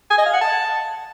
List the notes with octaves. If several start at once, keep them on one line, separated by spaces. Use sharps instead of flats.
G#5
D#5
F5
F#5
A5